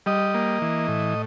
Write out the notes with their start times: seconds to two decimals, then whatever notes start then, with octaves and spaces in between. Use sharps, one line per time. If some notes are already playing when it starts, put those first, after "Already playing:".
0.06 G3 D#5
0.34 A#3
0.62 E3
0.88 A2